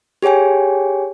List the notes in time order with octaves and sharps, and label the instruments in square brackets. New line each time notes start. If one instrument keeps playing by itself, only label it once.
[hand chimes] G4 G#4 C#5 G5 G#5